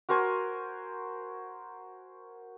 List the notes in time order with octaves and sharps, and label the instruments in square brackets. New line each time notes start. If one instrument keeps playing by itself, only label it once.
[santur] F#4 A#4 C5 G#5